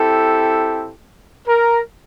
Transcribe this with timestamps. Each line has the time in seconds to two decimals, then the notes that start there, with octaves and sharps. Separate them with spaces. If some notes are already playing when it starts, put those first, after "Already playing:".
Already playing: C4 E4 G4 A4
1.48 A#4